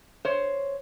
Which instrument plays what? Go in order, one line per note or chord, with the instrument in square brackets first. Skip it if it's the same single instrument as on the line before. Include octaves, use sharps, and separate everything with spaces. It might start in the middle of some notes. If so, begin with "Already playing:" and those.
[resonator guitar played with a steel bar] C5 C#5